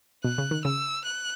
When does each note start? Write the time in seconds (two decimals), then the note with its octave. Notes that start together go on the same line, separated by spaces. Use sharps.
0.24 B2 F#6
0.38 C#3
0.51 D#3
0.65 C#3 E6
1.05 F#6